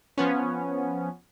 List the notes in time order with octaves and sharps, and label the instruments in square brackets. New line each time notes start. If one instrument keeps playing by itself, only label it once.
[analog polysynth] F3 B3 C#4